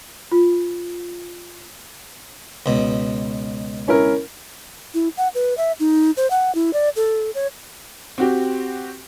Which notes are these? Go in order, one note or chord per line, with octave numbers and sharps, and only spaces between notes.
F4
C#2 B2
C#4 E4 A#4
E4
F#5
B4
E5
D#4
C5
F#5
E4
D5
A4
C#5
C4 F#4 G4